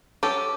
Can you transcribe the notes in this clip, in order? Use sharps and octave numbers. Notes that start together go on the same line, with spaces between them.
C#4 G4 A4